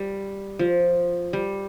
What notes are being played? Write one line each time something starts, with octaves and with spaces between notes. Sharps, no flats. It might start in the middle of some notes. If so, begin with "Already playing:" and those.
Already playing: G3
F3
G3